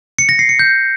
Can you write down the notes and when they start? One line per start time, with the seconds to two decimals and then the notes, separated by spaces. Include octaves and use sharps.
0.19 C#7
0.29 A#6
0.39 C7
0.49 C#7
0.59 G6